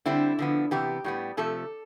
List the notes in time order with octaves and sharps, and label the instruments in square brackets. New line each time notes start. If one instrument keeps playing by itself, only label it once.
[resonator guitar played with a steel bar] D3 G3 C4 E4
D3 F3 B3
C3 E3 B3 G4
A2 G3 B3
C3 F3 A3 A4